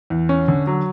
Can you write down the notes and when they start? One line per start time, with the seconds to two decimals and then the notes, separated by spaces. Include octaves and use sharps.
0.10 E2
0.29 C#4
0.48 D3
0.67 F#3